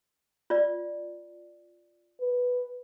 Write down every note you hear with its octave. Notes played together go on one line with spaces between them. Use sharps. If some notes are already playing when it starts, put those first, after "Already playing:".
F4 D5
B4